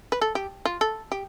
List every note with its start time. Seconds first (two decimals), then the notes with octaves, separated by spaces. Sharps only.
0.12 B4
0.21 A4
0.35 G4
0.65 F4
0.81 A4
1.12 G4